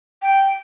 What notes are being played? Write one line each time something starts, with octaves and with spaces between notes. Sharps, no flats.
G5